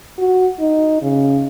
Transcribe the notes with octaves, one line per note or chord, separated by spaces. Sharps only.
F#4
D#4
C#3